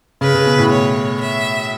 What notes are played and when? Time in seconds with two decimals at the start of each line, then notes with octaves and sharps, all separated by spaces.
0.21 C#3 B4
0.35 C#3
0.46 B2
0.58 A2
0.71 C#5
1.21 E5